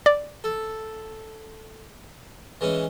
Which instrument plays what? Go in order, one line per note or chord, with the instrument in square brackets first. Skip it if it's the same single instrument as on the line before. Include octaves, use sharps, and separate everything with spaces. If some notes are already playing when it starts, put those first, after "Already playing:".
[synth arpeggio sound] D5
[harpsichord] A4
E3 G#3 C#4